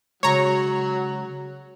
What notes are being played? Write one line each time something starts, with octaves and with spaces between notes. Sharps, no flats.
C#3 F#3 G#3 C#5 A#5